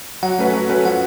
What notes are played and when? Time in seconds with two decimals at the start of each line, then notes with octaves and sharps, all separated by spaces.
0.23 F#3 F#5
0.39 A3 C#4 F#4 B4
0.54 F#3
0.69 A3 C#4 F#4 B4
0.85 F3 F#5